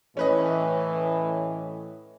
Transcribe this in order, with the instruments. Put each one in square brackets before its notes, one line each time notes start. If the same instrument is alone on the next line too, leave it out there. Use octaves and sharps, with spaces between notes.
[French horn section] A2 E3 [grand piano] C#4 B4 D#5